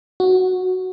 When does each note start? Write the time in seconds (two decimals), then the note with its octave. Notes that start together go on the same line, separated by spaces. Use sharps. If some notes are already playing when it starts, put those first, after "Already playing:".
0.20 F#4